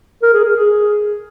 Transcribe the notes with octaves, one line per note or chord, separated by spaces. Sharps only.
A#4
G#4
G#4
G#4